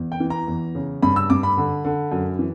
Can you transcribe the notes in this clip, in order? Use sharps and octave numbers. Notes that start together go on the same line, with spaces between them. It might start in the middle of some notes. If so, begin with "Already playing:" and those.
Already playing: E2
G5
E3
A#5
E2
C#3
G2 B5
E6
G2 D6
B5
D3
D3
F#2
E3